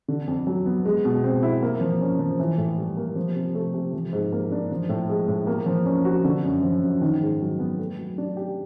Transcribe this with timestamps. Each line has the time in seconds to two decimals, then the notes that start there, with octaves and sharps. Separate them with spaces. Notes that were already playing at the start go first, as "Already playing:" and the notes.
0.08 D3
0.27 F2
0.47 F#3
0.66 B3
0.85 G#3
1.05 B2
1.24 C4
1.43 E4
1.62 A#3
1.81 F3
2.01 C#4
2.19 F3
2.40 E3
2.58 A2
2.78 G3
2.97 A#3
3.16 F3
3.35 C3
3.55 A3
3.74 C3
3.93 F3
4.13 G#2
4.32 A#3
4.52 D4
4.71 F3
4.89 A2
5.09 G#3
5.28 A2
5.47 A#3
5.66 F3
5.86 C#4
6.05 F#4
6.25 D3
6.44 F#2
6.63 F3
6.83 F#2
7.01 D#3
7.21 G#2
7.41 F#3
7.59 B3
7.79 A3
7.98 F#3
8.18 D4
8.37 G4